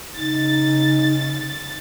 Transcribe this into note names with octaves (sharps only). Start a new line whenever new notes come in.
C#3 D#4 A6